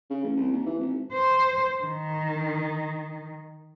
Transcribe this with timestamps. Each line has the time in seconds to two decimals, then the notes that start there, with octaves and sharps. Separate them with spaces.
0.10 C#3
0.24 A1
0.37 C2
0.52 D#2
0.66 E3
0.79 G#1
1.13 C5
1.83 D#3